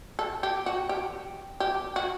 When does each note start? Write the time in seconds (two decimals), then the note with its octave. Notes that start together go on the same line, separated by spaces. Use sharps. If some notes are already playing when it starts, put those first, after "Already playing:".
0.19 A4
0.43 G4
0.66 F#4
0.89 G4
1.60 G4
1.96 F#4